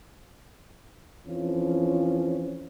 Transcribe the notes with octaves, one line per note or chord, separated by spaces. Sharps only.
F2 E3 F3 C#4